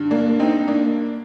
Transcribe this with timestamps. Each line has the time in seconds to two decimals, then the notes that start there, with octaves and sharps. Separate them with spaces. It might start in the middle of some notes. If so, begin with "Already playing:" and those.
Already playing: G2 D3
0.11 A#3 D4
0.40 C4 D#4
0.68 A#3 D4